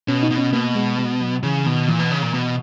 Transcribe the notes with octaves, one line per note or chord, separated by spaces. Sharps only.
B2 C#4
D#4
B2
C#4
B2 A#3
G#3
G#3
F#3
C#3 E3
B2 D#3
A#2 E3
B2
C#3
A#2
B2